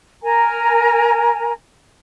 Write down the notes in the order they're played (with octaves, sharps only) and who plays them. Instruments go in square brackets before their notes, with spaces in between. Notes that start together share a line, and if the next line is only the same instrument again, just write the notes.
[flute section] A#4 G#5 A#5